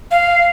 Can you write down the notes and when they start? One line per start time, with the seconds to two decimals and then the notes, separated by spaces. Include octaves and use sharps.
0.11 F5